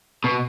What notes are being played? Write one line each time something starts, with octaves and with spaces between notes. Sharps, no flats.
B2